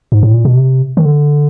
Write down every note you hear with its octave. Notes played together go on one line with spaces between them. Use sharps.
G#2
A2
A#2
B2
C3
D#3
D3